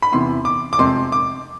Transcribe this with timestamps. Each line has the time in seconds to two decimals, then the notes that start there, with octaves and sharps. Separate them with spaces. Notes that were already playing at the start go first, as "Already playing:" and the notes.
0.02 B5
0.12 E2 C3 E3 C6
0.45 D6
0.73 D6
0.79 F2 C3 G#3 C4 C6
1.12 D6